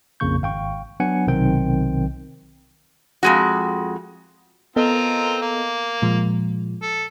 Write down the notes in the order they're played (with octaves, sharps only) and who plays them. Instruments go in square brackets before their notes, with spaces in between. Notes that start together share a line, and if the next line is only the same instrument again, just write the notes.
[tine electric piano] A#1 F2 C#3 A#3 C#6 G6
G#1 F5 G5 C#6
F#3 B3 D4 F#5 G#5 C#7
B1 C3 D#3 C4 G5
[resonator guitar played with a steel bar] F2 G#3 F#4
[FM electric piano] B3 A4 D#5 [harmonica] C4 F4 A#4
[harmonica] A#3
[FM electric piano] A#2 F3 G#3
[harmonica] A4